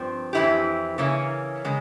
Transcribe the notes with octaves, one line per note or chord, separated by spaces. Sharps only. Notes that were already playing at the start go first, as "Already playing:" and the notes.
Already playing: G2 F3 C4
F2 E3 A#3 E4 G4
C#3 E3 A#3 C#4
C#3 G#3